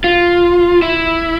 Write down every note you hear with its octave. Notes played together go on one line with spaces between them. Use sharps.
F4
E4